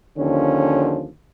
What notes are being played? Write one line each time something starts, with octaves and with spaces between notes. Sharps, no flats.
D#2 D3 F3 C#4